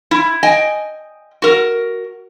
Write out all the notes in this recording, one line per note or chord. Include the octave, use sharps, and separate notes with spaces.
E4
D#5 G5 G#5
F#4 A#4